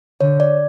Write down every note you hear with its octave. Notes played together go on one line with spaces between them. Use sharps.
D3 C#5
D5